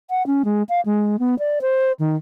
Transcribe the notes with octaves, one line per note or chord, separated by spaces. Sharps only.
F#5
C#4
G#3
F5
G#3
B3
D5
C5
D#3